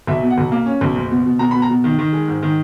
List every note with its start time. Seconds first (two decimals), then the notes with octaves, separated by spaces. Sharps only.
0.07 B1 E5
0.23 B2
0.30 F#5
0.38 B1
0.52 A#3
0.66 C#4
0.81 B1
0.96 F#1
1.11 B2
1.26 B2
1.39 B2 A#5
1.51 B5
1.55 B2
1.62 A#5
1.69 B2
1.84 D#3
1.99 D#3
2.13 G#3
2.28 G#2
2.43 D#3